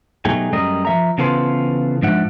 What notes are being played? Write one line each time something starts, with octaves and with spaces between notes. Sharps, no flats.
B2 F#3 A3 D#4 G4 G#4
F#2 G3 A3 A#4 D#5
F3 E5 A#5
C#3 E3 B3 F4 A4 C5
G#2 F3 D4 E5 F#5